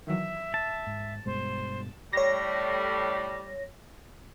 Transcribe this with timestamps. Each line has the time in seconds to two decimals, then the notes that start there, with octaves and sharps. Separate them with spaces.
0.07 D#3 E3 F#3 E5
0.54 A5
0.87 G#2
1.26 G2 B2 G#3 C5
2.13 A2 G3 C#5 A#6